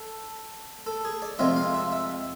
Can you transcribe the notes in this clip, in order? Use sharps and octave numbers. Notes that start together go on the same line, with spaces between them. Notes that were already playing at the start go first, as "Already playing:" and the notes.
Already playing: A4
A4
G#4
D5
F2 C3 G#3 C4 F4 E5
F5
E5
E5